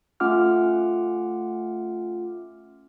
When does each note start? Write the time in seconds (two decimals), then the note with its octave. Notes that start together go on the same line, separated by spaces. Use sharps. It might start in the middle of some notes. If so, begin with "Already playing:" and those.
0.20 A3 C#4 F4 F#5 D6 F6